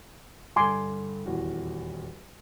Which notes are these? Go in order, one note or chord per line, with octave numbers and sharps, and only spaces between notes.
G2 D3 G#5 C6 D6
D#1 E2 F#4